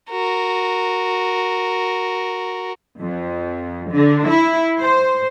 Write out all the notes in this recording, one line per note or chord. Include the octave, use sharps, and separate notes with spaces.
F#4 A#4
F2
D3
E4
C5